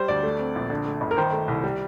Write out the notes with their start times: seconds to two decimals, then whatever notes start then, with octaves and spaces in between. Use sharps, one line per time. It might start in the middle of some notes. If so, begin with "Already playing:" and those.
Already playing: G3 C5
0.08 D2 D5
0.23 A3
0.39 C4
0.56 A#1
0.70 D3
0.86 A3
1.01 G1
1.11 A#4
1.17 D#3 C5
1.32 A3
1.48 C2
1.63 G3